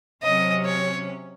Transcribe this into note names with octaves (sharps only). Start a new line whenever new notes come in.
C3 F#3 C#4 D#5
C#5